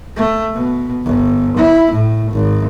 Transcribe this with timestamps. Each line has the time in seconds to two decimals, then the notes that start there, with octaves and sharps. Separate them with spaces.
0.16 A3
0.53 B2
1.06 G1
1.57 E4
1.91 A2
2.31 G#1